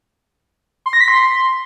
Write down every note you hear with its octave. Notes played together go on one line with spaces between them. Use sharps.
C6
A#6
B6
C6